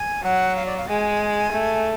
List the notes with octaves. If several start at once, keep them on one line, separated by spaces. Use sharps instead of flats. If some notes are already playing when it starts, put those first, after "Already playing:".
Already playing: G#5
F#3 F#5
F5
D5
F5
G#3 G#5
A3